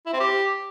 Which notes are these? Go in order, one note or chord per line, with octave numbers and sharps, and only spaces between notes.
E4
C4
G4